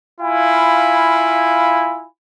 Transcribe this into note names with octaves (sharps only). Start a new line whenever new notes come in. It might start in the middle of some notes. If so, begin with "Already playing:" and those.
E4 F4 F5 G#5 B5